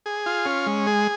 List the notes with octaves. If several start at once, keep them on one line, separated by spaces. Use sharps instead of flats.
G#4
F4
C#4
G#3
G#4